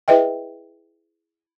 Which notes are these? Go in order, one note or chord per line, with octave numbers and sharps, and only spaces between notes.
E4 G#4 B4 D#5 E5 G5